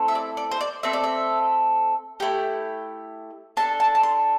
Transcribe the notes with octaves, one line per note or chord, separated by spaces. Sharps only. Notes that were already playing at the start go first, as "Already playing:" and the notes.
Already playing: A3 C4 E4 A4
E5
D5
D5
C5
D5
A3 C4 A4 E5
D5
E5
A3 E4 G4 G5
D4 A4 A5
A5
A5
C6